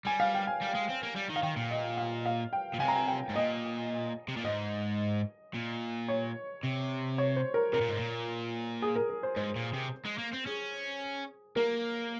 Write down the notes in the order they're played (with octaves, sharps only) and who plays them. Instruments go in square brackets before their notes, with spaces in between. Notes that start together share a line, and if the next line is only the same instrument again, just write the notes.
[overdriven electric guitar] G3 [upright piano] G#5
[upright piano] F5
G5
G#5
[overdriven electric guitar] G3
G#3
C4
A#3
G3
D#3
[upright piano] F5
[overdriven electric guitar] D#3 [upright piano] G5
[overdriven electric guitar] A#2
[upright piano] D#5
F5
F5
G5
[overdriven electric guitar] A#2
[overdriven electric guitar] C3 [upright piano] G#5
[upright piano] A#5
G#5
G5
[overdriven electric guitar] G#2
[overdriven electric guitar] A#2 [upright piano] D#5
[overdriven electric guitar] C3
A#2
[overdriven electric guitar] G#2 [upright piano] D#5
[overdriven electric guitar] A#2
[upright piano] C#5
[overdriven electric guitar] C3
[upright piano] C#5
C5
A#4
[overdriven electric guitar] C3 [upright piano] A#4
[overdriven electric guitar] A#2
G#2
A#2
[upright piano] G#4
A#4
A#4
C5
[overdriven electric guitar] G#2 [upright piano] C5
[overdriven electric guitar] A#2
C3
G#3
A#3
C4
[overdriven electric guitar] C#4 [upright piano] G#4
[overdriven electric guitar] A#3 [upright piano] A#4